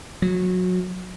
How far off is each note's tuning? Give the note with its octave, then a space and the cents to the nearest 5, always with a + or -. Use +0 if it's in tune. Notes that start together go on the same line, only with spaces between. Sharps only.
F#3 -20